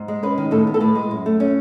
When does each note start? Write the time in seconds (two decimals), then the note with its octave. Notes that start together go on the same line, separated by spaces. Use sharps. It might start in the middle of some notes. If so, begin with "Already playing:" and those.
Already playing: G#2
0.08 G#3
0.23 C#4 B4
0.38 D#3
0.51 A2 A4
0.67 B3
0.74 A4
0.81 A2 B4
0.95 G#3
1.11 F#2
1.26 A3
1.40 C#4